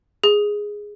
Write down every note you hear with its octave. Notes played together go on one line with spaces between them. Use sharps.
G#4